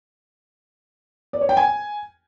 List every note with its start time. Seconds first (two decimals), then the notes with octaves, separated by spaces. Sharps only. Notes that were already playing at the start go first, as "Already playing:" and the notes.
1.33 D5
1.41 C#5
1.49 G5
1.57 G#5